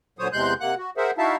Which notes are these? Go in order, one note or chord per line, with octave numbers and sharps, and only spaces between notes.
A#2 D3 F#3 C5 C#5 D#6
E2 C3 G#3 C6 F#6 G6
C3 A#3 F#5 F#6
F#4
G#4 A#4 C5 E5 F#5
D#4 E4 F#4 E5 F5 A5